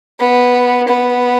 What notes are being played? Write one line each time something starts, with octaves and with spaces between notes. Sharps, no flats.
B3
B3